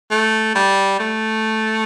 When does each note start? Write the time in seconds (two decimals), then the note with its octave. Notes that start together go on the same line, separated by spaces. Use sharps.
0.11 A3
0.55 G3
1.00 A3